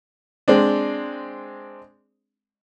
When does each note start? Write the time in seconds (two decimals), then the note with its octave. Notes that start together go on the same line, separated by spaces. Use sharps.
0.48 G#3 C4 D4